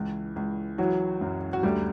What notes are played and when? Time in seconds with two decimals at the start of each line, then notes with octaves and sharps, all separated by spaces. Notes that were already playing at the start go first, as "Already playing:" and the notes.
Already playing: C#2 E3
0.36 C#2
0.78 E3 F#3 F#4
1.21 F#2
1.53 F#4
1.63 D2 G3 G4